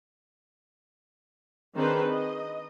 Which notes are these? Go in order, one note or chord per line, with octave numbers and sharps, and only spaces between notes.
D#3 C4 D4 G#4 B4 C5
D#5